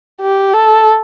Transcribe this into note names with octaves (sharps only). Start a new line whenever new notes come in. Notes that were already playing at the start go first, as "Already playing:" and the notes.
G4
A4